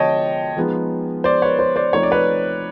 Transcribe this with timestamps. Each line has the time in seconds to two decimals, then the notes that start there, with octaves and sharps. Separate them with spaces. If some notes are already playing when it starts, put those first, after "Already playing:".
Already playing: D3 F3 G#3 B3 C#5 D#5 G5 A5
0.57 F3 G#3 B3 D#4
1.24 C5 D5
1.42 B4 C#5
1.59 C5
1.76 C5 D5
1.93 F3 A3 C4 D#4 C#5
2.03 D5
2.12 B4 C#5